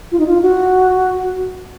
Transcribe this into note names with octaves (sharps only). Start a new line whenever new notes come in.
F4
D#4
F4
F#4